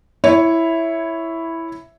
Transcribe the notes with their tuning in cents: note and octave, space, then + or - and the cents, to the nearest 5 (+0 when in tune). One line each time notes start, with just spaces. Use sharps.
E4 +0 C#5 +0 E5 +0